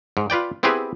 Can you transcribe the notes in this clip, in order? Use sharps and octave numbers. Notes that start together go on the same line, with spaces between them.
G#2
F4 B4 D5 G5
B3 C4 E4 G4 G#4 B4